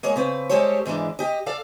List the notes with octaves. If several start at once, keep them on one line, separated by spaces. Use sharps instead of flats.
G#3 A#3 G#4 C#5
C#3 C4 B4
G3 G#3 G4 A4 C5 C#5
G#2 E3 G#3 D4
G4 D#5
A4 D5 F5